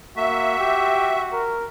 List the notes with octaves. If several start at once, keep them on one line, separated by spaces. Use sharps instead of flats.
A#3 F#4 E5
G4
A#4